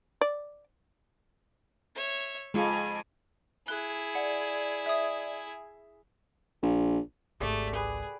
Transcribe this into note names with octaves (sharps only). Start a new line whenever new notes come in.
D5
C#5 E5
F2 G#3 F4 G#5
E4 G#4 F#6 G7
D5 F#5
E5 D#6
A#1
G#1 C#2 A3 G4 G#4 D5
G#4 B4 B5